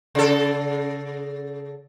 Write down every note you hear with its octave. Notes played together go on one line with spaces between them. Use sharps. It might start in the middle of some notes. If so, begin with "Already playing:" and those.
C#3 A4